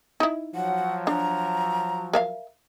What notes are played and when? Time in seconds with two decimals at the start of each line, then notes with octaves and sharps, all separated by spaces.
0.20 D#4 E4
0.55 F3 F#3 F#5
1.07 D4 A#5
2.13 A#4 E5 F5